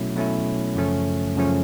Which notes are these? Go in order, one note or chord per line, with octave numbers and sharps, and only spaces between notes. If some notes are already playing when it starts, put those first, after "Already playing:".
Already playing: B2 F#3 A3 C#4 E4
B2 F#3 A3 C#4 E4
F#2 C#3 F3 A3 C#4
F#2 C#3 F3 A3 C#4